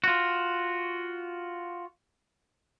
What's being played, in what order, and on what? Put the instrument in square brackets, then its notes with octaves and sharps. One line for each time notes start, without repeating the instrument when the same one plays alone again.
[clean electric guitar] F4 F#4